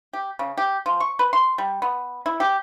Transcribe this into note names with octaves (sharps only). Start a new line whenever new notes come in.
G4
C#3
G4
F3
C#6
B4
C6
G3
B3
E4
G4